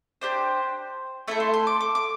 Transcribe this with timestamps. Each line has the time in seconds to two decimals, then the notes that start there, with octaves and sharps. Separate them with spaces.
0.21 D4 G4 C5
1.28 A3 E4 A4 E5
1.40 C6
1.54 C6
1.67 D6
1.81 D6
1.95 D6